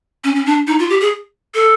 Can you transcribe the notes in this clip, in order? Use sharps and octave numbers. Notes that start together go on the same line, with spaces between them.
C#4
C#4
D4
D#4
F4
G4
G#4
A4